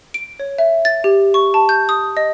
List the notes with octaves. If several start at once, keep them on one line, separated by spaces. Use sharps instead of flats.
D7
C#5
E5
A6
G4
C#6
A5
G6
D#6
D#5